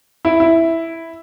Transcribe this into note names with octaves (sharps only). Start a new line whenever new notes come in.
E4
E4